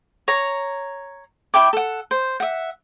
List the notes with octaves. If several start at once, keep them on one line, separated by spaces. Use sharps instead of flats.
C#5 A#5
E4 G5 D6
A4 F#5
C5
E5 F#5